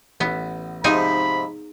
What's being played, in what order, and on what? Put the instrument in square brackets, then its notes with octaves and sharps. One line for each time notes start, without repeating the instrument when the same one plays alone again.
[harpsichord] A1 [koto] B3
[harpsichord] G#2 C3 F3 [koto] D#4 G#4 [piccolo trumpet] B5